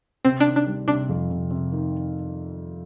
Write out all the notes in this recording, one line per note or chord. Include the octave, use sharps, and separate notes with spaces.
C3 C4
D4
D#3
D4
G3
C3 D4
F2
C3
C3
D#3